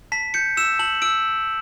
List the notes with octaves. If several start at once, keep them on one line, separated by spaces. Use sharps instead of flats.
A5 B6
G6 C#7
E6 E7
A5 F#7
E6 D7